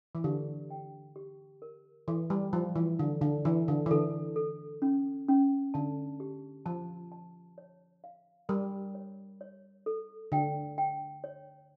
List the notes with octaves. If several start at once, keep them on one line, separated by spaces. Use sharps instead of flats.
E3
D3 G4
G5
G4
A#4
E3 A4
G3
F3 E4
E3
D3 E4
D3
E3 E4
D3
E3
D3 A4
A4
C#4
C#4
D3 A5
G4
F3 A5
A5
C#5
F5
G3 A#4
C#5
C#5
A4
D3 G5
G5
C#5